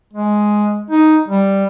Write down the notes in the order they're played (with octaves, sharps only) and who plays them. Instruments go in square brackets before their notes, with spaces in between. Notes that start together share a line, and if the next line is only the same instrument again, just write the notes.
[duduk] G#3
D#4
G3